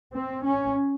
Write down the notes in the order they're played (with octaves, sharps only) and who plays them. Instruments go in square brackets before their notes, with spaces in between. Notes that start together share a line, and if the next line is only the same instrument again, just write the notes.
[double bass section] C4
C#4